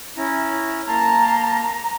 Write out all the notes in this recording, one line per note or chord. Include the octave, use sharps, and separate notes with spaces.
C#4 E4 A#5
A#3 A5 A#5 C6